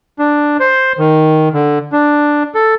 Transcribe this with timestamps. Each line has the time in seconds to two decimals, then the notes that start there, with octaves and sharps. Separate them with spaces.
0.19 D4
0.60 C5
0.99 D#3
1.54 D3
1.93 D4
2.55 A4